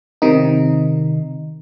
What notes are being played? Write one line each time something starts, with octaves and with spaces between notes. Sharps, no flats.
C3 D#3 D#4